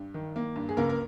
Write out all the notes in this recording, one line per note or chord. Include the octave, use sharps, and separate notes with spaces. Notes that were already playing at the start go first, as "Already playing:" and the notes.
Already playing: G2
D#3
A#3
G2
G#4
C#2 A#3 A#4
A#4